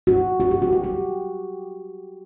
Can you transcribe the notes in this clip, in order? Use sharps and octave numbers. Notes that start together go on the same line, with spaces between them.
F#4
F#4
G4
F#4
F#4
G4